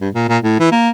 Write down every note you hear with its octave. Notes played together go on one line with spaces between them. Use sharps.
G2
A#2
A#2
A2
E3
A#3